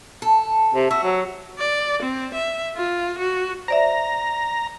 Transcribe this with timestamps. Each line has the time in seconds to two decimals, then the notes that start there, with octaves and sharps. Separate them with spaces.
0.22 A4
0.74 C3
0.91 F#4 E5
1.03 F#3
1.59 D5
2.02 C4
2.34 E5
2.76 F4
3.18 F#4
3.68 C5 D5 E5 A#5